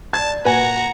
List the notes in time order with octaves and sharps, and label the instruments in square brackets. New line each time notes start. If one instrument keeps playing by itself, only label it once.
[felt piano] D5 G#6 [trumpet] A5
[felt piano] A#2 [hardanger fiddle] F#4 [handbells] B4 G#5 [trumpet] A#5